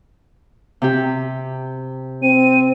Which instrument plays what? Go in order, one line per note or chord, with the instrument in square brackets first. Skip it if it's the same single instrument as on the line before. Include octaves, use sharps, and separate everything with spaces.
[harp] C3 G4
[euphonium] C4 [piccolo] D#7